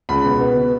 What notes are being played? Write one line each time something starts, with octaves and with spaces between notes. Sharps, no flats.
C#2 B5
B2
B3
B2